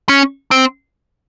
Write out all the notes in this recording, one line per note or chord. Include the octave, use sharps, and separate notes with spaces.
C#4
C4